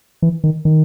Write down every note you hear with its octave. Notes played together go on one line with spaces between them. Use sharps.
E3
D#3
D#3